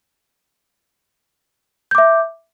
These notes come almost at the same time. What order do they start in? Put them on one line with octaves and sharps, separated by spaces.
G6 D6 E5